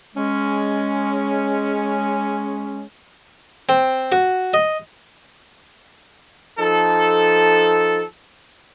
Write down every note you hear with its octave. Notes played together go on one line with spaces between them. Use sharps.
G#3 C#4
C4
F#4
D#5
F3 D#4 A4